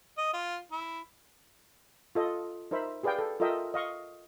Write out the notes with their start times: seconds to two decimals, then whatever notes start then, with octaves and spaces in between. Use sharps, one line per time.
0.18 D#5
0.34 F4
0.72 E4
2.15 F4 A4 D#5
2.71 D#4 A#4 C5 E5 B5
3.03 G4 G#4 B4 D5 F5 G5
3.19 A4
3.40 F4 A4 A#4 D#5 E5 G5
3.74 D#5 F5 C#6